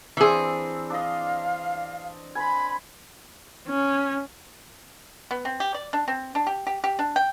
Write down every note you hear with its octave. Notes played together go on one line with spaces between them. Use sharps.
E3 C4 D4 G#4 E5
D4 D#5 F5
G#5 B5 C6
C#4
B3
C4
G4
D5
D4
C4
D4
G4
G4
G4
D4
G5